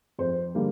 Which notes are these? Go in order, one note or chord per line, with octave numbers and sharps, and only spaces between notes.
F2 C5
D3 G3 A#3